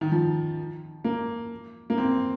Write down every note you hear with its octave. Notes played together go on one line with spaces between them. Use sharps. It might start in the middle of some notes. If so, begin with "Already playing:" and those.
D#3
F3
A#3
A#3
C4